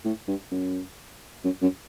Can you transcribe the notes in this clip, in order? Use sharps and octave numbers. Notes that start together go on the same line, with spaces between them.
A2
G2
F#2
F#2
F#2